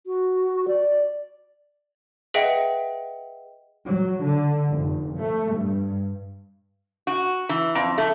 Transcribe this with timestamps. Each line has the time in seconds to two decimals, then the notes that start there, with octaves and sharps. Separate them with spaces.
0.07 F#4
0.68 D5
2.34 G#4 B4 D#5 E5 F#5 G5
3.84 F#3
4.21 D3
4.70 F1
5.19 A3
5.53 G2
7.07 F#4
7.49 E3
7.75 F2
7.98 A3